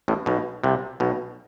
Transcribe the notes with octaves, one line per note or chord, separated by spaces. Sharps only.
A1 A2
B1 B2
C2 C3
B1 B2